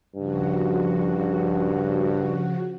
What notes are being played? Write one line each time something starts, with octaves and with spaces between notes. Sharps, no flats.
G2 C#3 F3 F#4